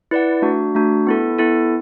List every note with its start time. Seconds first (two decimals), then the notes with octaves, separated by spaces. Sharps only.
0.11 E4 B4 D5 F#5
0.42 A3 D4 F#4
0.75 A3 D4 F#4
1.07 B3 E4 A4
1.39 B3 E4 A4